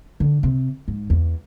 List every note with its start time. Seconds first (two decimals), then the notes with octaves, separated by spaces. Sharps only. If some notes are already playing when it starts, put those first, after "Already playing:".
0.20 D3
0.43 C3
0.88 G#2
1.10 E2